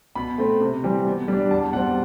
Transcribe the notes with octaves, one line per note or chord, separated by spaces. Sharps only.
B2 B5
A3 C4
C3
E3 G3 C4
B2
G3 D4
E2 A5
B2 G3 C4 F#5